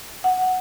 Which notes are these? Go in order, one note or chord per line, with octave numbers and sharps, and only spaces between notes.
F#5